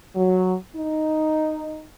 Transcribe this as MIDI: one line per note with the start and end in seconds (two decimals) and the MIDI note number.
0.16 0.54 54
0.75 1.85 63